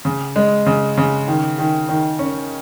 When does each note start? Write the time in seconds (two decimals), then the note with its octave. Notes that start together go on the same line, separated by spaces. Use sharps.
0.05 C#3
0.36 G#3
0.66 C#3
0.97 C#3
1.27 D#3
1.58 D#3
1.89 D#3
2.19 C#4